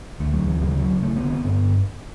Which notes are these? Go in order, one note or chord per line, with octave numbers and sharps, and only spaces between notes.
D2 A3
F#3
D2
E3
C#3 F#3
G3
C#3 F#3
A1 A3
B3
D3
B3
G2 B3